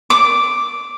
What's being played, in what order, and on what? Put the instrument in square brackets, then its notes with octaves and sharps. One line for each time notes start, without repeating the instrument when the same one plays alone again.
[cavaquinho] D6